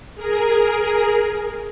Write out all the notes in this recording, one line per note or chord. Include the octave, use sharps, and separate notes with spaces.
G#4 A#4